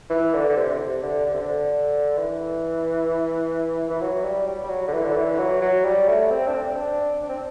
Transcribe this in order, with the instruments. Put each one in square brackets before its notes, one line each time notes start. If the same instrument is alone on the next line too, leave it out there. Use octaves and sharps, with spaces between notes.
[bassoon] E3
D3
D3
C3
C3
D3
D3
C3
D3
E3
E3
F#3
G3
G3
G3
F#3
D3
E3
D3
E3
F#3
F#3
G3
A3
C4
D4
C4
D4
D4
C4